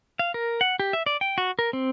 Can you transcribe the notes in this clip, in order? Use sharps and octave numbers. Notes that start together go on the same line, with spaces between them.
F5
A#4
F#5
G4
E5
D5
G5
F#4
A#4
C4